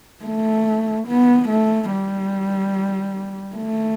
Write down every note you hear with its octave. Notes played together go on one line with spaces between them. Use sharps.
A3
B3
A3
G3
A3